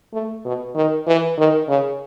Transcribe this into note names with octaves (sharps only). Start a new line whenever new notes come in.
A3
B2
D#3
E3
D#3
C#3